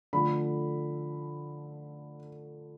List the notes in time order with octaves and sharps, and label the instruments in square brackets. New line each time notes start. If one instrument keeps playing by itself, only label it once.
[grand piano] D3 F3 A3 B5